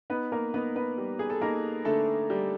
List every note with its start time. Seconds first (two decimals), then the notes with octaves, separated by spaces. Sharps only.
0.10 B3 D#4 B4
0.32 A#3 A#4
0.54 B3 D#4 B4
0.76 B3 B4
0.98 G3
1.19 G#4
1.30 A4
1.41 A#3 D#4 A#4
1.85 D3 A3 A4
2.30 G3